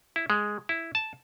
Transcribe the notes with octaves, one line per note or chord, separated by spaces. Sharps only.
E4
G#3
E4
A5